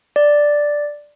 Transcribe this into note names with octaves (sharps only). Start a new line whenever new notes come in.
D5